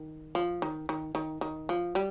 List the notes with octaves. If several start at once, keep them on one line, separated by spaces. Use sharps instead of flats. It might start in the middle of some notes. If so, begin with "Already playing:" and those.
Already playing: D#3
F3
D#3
D#3
D#3
D#3
F3
G3